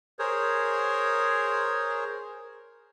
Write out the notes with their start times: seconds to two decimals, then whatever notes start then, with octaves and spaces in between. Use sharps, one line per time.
0.19 G#4 A#4 C5 C#5